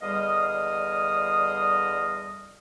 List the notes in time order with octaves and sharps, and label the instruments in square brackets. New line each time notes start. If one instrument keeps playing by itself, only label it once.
[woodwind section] E2 D3 G3 D#5 F5 D#6